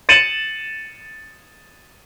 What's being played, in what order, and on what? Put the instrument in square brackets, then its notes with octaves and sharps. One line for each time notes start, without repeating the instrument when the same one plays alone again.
[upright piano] A6 C#7 D#7 E7 F#7